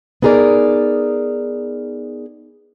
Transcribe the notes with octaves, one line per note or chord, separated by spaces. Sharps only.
B3 D#4 G#4 A#4 D5